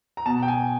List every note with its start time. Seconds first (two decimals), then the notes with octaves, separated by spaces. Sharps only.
0.17 A#5
0.26 B2 A5
0.43 G5
0.48 G#5